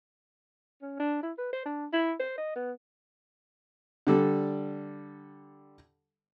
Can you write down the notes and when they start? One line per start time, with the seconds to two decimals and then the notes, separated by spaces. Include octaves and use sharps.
0.82 C#4
1.00 D4
1.23 E4
1.38 B4
1.53 C5
1.66 D4
1.93 E4
2.20 C5
2.38 D#5
2.56 B3
4.07 D3 G3 A4